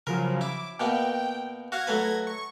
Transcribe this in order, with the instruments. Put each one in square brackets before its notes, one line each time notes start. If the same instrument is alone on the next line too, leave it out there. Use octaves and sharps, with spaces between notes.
[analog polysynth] C#3 F3 F#3 [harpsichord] A#4
[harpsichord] E4 [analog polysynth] D6
[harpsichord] B2 A#3 [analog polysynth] G5
[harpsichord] F#4 F5 [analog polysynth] G#6 A#6
[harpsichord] F#3 A3 B4
[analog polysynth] C#6